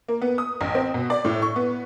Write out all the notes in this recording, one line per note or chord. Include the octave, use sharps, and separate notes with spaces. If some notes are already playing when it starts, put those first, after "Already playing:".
A#3
B3
D#6
A1
C4
B2
D5
A2
C#6
B3